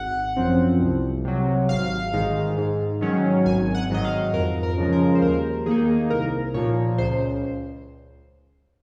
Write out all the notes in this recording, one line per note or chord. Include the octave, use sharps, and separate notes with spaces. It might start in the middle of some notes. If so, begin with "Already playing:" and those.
Already playing: G#1 F#5
F#2 F3 C4
C2
C3 F#3
G#1 F5
G#2 D#3 G#3
G#2
D#3 F#3 C#4
G#1 G#5
F#5
G#2 D#3 F#3 D#5
F5
F2 A#4
A#4
C#3 F3 G#3
A#4
C5
D#2 A#4
D#3 A#3 D#4 G#4
C2 A#4
A#2 F3 A#3 C#5
C#2 C5